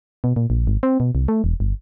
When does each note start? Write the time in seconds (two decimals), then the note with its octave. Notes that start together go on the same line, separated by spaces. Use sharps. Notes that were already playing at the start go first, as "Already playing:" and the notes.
0.24 B2
0.36 A#2
0.50 A#1
0.67 G#1
0.83 C4
1.00 B2
1.15 C2
1.28 A3
1.44 E1
1.60 G1